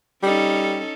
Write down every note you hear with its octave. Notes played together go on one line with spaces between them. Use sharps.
G3 C#4 D#4 A4